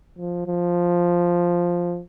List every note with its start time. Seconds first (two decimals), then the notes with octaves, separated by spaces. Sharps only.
0.18 F3
0.47 F3